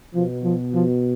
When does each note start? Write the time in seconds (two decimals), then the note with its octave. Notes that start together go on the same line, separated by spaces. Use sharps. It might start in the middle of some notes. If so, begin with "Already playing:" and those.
0.15 B2 F3
0.44 F3
0.74 F3